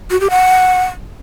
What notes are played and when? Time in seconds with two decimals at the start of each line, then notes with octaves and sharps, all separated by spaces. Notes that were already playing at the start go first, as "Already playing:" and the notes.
0.11 F#4
0.21 G4
0.30 F#5